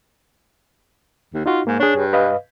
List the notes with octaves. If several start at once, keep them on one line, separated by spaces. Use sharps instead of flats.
D#2
D#4 F4 F#4
G#2 A#3
D4 G#4 C#5
G2
B4 D#5 F5